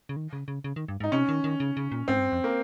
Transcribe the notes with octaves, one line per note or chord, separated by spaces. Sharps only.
C#3
D#3
C#3
C#3
C#3
D#3
G2
G#2 D#4
C3 C#4
D#3
D#3
C#3
C#3
A#2
G#2 C4
G2
F2
A#3